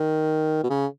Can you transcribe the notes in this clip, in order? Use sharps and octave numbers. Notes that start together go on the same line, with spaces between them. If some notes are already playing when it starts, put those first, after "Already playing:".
Already playing: D#3
B2
C#3